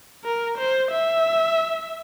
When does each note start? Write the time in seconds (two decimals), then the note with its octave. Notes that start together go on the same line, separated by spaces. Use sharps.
0.24 A#4
0.58 C5
0.91 E5